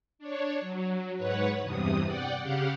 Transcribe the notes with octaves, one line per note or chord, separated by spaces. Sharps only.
D4 C#5
F#3
G#2 B4 C#5 F#5
E2 G2 C3 D#6
D5 F#5 G5
C#3 G4 F5 F#5